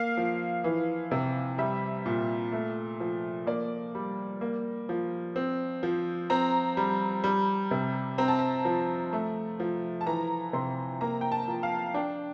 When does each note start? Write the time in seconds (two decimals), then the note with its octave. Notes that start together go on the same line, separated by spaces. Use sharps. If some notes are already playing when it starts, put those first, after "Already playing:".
Already playing: A#3 F5
0.17 F3
0.64 E3
1.11 C3
1.58 G3 E5
2.06 A#2
2.52 A3
3.00 F3
3.47 A#3 D5
3.95 G3
4.41 A#3
4.89 F3
5.36 C4
5.83 F3
6.30 C4 A#5
6.77 G3
7.24 G3
7.71 C3
8.18 C4 A#5
8.28 A5
8.39 A#5
8.65 F3
9.13 A3
9.60 F3
10.01 A5
10.06 E3 A#5
10.53 C3 C6
11.01 A#3 A#5
11.21 G5
11.32 A5
11.48 F3
11.63 F5
11.94 D4 G5